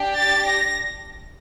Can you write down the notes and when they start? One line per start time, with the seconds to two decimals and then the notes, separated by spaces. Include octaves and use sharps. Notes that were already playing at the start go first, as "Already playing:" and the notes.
Already playing: D4 G4
0.16 A6
0.45 A#6